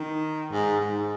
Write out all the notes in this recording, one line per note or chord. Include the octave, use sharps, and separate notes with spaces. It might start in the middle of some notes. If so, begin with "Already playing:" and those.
Already playing: D#3
G#2
G#2